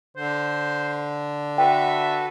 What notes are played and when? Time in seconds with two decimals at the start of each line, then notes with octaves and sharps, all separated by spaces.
0.17 D3 C5
1.58 F#4 A4 B4 E5 G5